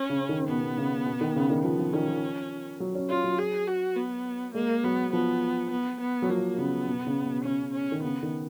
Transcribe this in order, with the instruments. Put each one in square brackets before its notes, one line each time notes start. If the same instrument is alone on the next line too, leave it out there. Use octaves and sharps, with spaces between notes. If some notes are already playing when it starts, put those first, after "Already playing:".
Already playing: [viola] C#4
[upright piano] C#3
D#3
[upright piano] B2 [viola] B3
[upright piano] C#3
B2
D#3
C#3
D#3
[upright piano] F3 [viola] B3
[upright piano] F3
[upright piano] D#3 [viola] C#4
[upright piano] F3
F#3
C#4
[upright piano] C#4 [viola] F4
[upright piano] F#3
[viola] G#4
F#4
B3
[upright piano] G#3 [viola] A#3
[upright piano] F#3 [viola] B3
[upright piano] F3 [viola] B3
[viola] B3
B3
[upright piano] F#3
[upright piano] F3 [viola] A#3
[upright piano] C#3 [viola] B3
[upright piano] B2
C#3
B2
[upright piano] C#3 [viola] C#4
[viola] C#4
[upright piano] D#3
[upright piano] C#3 [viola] B3
[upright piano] D#3